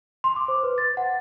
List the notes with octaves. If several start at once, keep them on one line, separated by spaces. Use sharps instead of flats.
C6
D6
C5
B4
A6
F#5